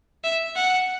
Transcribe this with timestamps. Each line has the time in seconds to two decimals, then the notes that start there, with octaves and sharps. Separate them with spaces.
0.24 E5
0.56 F#5